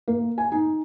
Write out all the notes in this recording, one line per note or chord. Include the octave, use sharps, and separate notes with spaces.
A#3
G#5
D#4